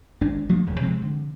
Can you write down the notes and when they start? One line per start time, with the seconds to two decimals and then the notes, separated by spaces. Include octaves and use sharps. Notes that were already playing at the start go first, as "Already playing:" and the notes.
0.21 G#1 G#3 D4
0.49 F3 F#3 A3 A#3
0.66 F1 D#2 C#3
0.81 C3 F3 G#3 C4
1.02 D3